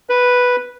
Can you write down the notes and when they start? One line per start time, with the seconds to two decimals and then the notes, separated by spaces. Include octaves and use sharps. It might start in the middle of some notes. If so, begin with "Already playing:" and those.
0.09 B4